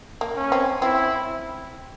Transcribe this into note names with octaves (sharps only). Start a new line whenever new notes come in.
A#3
C#4
C4
C4 E4